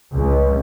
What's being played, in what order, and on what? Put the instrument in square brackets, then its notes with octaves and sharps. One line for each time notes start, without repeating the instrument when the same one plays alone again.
[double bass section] C#2